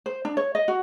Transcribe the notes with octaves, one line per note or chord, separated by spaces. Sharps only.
C5
D4
C#5
D#5
F#4